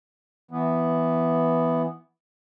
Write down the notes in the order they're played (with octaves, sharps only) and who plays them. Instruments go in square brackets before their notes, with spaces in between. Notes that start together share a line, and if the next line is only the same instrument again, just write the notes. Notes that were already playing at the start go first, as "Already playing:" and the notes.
[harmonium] E3 B3